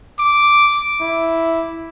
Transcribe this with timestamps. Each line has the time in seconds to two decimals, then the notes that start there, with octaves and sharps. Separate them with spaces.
0.19 D6
1.01 E4